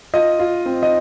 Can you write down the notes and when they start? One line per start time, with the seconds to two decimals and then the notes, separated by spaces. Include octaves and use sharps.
0.14 F4 D#5
0.39 F4
0.66 C4
0.83 D#5